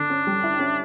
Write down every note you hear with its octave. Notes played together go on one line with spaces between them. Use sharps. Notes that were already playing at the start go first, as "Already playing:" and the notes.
Already playing: D3 D4
C#4
G3
E4
C#4